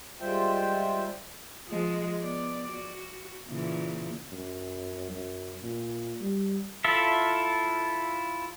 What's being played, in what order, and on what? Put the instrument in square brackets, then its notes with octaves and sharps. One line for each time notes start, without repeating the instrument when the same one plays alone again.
[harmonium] G3 G#3 F4 C5 E5 G5
[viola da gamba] F3 G#3
B3 D5
F#4
A#2 C#3 E3
[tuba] F#2
F#2
A#2
G3
[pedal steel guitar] E4 F4 A4 E5